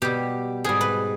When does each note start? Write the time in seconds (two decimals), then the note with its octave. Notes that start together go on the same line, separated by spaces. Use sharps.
0.02 B2 G3 G4
0.64 G#2 G3 G#4
0.81 B4